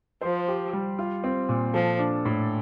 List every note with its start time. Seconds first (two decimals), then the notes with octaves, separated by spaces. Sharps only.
0.22 F3 C5
0.48 G4
0.73 G3
0.99 F4
1.24 C4
1.49 A#2
1.74 F3 A4
1.99 D4
2.25 A2